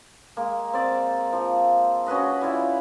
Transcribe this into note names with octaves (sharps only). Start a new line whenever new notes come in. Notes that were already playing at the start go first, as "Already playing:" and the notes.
G#3 A#3
C4 D5
F3
C#4 F#4 B4 D#5
G3 E4 F4